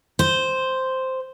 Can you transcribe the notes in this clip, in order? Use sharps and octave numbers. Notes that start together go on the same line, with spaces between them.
C5